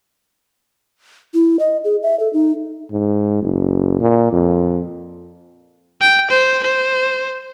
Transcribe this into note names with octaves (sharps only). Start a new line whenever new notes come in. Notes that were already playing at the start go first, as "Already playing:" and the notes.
E4
D#5
G#4
E5
A4
D#4
G#2
F#1
A#2
F2
G5
C5
C5